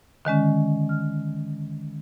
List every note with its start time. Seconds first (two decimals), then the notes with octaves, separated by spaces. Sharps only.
0.25 D3 D#3 G#3 C#4
0.89 F6